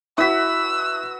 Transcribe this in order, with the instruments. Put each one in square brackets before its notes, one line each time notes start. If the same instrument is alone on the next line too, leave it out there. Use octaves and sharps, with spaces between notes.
[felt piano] E4 B6 [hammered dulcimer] F#4 B4 [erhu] E6